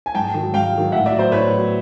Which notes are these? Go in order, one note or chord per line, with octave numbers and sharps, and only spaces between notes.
G#5
G#2 G5 A5
D#3 F#3
G#2 F5 G5
D#3 F#3
A2 E5 F#5
D5 E5
F#3
C5 D5
A2 B4 C#5
F#3